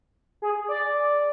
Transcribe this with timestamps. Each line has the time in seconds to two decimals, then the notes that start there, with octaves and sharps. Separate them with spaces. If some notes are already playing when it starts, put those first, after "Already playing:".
0.42 G#4
0.68 D5